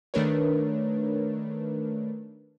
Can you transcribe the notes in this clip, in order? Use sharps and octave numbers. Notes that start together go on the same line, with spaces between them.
D#3 A3 D4 A#4 B4 C#5